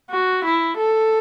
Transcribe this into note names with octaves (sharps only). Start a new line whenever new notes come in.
F#4
E4
A4